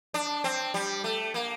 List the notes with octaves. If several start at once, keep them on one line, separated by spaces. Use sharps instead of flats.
D4
C4
G3
A3
A#3